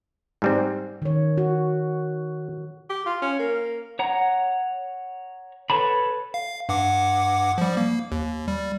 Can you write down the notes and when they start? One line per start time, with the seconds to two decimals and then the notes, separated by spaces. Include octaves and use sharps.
0.42 G#2 G3 C4
1.02 D#3 C#5
1.38 F#4
2.90 G4
3.06 F4
3.22 C#4
3.39 A#3
3.99 C#5 F#5 A#5
5.70 A4 B4 C#5 A5 B5
6.34 F5
6.69 G2 F#5 D6
7.58 F3 G3
7.77 A#3
8.12 D#2
8.48 G3